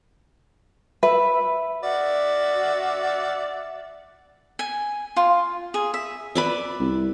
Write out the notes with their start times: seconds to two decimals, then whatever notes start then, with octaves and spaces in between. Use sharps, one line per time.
1.03 B4 E5
1.83 F#4 D5 E5 F#5
4.59 G#5
5.16 F4
5.74 G#4
5.94 E5
6.35 B4 D5 E5
6.80 C2